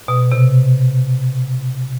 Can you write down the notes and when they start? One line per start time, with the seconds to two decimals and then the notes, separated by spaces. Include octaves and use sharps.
0.08 B2
0.32 C3